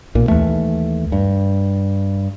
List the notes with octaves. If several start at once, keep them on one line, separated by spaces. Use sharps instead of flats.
B1 A#2
D#2 E3 A3
G2